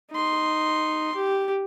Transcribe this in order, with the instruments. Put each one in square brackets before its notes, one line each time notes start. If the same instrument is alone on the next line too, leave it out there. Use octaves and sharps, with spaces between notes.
[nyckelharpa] D#4 C6
G4